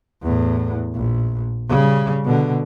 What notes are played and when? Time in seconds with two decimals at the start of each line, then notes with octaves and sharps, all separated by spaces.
0.23 E2 A2
0.94 A#1
1.69 C#3 G3
2.25 B2 D3